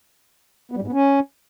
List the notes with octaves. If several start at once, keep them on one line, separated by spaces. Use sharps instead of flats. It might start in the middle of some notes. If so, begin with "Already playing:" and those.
B3
G3
G#2
B3
C#4